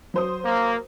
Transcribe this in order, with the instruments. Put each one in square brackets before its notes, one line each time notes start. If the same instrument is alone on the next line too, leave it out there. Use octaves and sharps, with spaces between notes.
[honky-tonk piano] F#3 C5 D#6
[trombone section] A#3